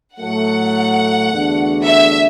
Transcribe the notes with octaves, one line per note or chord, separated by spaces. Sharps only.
A2 F#3 A3 F#5
E2 D3 A3 D4 F#4
E5